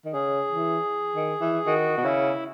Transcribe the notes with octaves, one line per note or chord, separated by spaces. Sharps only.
D#3
C#3 G#4
E3
D#3
E3
D#3 F#4
B2
C#3 E4